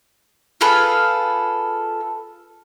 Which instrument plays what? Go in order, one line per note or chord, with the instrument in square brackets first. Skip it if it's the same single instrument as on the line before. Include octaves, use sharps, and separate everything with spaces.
[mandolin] F4 G#4 A4 B4